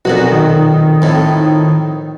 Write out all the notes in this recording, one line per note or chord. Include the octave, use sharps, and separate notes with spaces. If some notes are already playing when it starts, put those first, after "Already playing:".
B1 F2 A#2 F#4
D#3
F2 A2